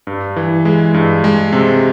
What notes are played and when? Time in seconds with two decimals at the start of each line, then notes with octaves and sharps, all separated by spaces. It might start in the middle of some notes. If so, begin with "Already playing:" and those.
0.07 G2
0.36 E3
0.65 G#3
0.94 G2
1.24 G#3
1.53 C3